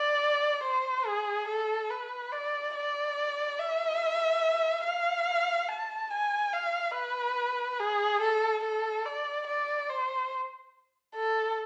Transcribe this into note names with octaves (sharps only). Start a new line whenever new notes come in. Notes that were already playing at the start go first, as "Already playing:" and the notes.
Already playing: D5
C5
G#4
A4
B4
D5
D5
E5
F5
A5
G#5
F5
B4
G#4
A4
A4
D5
D5
C5
A4